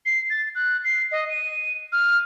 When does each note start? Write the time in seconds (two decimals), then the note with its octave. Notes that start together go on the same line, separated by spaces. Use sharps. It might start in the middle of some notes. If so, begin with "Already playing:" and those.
0.06 C7
0.30 A6
0.55 F#6
0.84 C7
1.12 D#5
1.30 D#7
1.92 F6